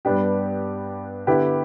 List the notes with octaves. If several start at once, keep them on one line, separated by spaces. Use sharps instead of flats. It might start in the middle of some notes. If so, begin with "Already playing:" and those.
G2 G3 B3 D4 G4
D3 B3 E4 G4 B4